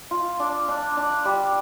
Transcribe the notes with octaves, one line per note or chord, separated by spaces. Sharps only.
F4
D4
D4
D4
G3